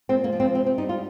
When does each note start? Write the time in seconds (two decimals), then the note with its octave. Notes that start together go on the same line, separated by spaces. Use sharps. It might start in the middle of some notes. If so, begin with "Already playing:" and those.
0.09 A#2 C4
0.24 A#3
0.33 F3
0.40 C4
0.55 C3 C4
0.66 C4
0.78 G3 D#4
0.89 F4